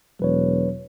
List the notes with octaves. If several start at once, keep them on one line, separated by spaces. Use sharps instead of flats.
E1 F#3 B4 C#5